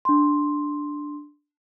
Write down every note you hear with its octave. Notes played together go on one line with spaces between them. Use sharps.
D4 C6